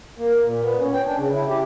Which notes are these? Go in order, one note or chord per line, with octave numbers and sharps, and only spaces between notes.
A#3
A#2
B3
C#4
G5
D4
C#3
E4
G4